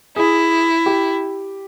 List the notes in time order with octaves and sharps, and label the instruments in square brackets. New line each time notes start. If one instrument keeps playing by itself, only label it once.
[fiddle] E4 [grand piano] G#4
[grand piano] G4